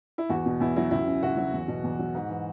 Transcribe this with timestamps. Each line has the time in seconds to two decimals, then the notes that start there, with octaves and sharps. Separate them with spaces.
0.18 E4
0.29 E2 F#4
0.46 B2
0.60 E2 E4
0.76 F#3 E4
0.91 C#2 E4
1.07 C#3
1.23 C#2 F#4
1.37 F#3
1.53 E2
1.68 B2
1.84 E2
1.99 F#3
2.15 G#2
2.29 E3